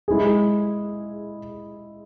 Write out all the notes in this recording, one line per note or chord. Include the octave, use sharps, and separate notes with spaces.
G#3 E4 G#4